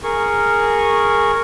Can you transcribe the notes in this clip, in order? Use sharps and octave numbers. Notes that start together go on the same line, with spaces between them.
G#4 A#4 C#6